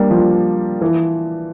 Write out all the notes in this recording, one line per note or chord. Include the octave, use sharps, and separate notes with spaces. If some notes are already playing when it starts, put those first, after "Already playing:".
Already playing: G3 A#3 D4
F3
E3